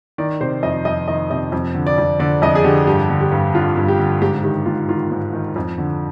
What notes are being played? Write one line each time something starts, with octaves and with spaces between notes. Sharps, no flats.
D#3 D5
C3 C5
F2 D#5
F2 D#5
D#3 D#5
C3 D#5
F2
D3
D5
F2
D3 D5
F2 D#5
G#4
D3 G4
G2 G4
D3
G4
G2
D3 F4
G2
G4
D3
G#2 G4
D#3 G4
G#2 F4
D#3 F4
G#2
D#3
F2
D3